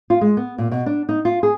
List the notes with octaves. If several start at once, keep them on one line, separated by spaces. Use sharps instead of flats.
F4
G#3
B3
A#2
B2
D4
D#4
F4
G#4